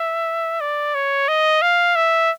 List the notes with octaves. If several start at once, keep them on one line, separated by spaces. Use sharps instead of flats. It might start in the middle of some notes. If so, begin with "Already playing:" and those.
Already playing: E5
D5
C#5
D#5
F5
E5